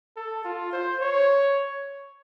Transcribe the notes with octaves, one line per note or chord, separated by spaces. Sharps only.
A4
F4
C5
C#5